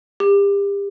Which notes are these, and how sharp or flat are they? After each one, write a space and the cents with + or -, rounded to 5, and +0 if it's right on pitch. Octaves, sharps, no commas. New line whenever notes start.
G4 +35